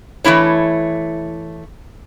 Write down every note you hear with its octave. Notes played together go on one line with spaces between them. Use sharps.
E3 A3 A#3 E4 C#5